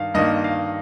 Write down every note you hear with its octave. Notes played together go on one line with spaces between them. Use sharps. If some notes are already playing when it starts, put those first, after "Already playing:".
Already playing: G2 D#3 F5
G2 D#3 A#3 D#5
F5